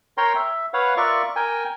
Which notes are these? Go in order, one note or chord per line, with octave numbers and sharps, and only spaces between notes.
A#4 C#5 G5 A#5 C6
E5
B4 C#5 F5 F#5
F4 A#4 D5 E5 C#6
A#4 G5 G#5